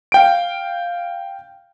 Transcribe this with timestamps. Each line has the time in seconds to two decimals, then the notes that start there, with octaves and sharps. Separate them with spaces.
0.12 F5 G5 D7